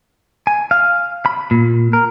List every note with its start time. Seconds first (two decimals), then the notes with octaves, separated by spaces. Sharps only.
0.47 G#5
0.71 F5
1.26 B5
1.51 A#2
1.93 A#4